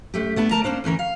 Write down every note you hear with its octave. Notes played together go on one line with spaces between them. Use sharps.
F#2 A3 G4
A3 B3 D4
D2 A#4 A5 A#5
A#3 C#4 D4 C5
D2 E3 C#4 A#4
F5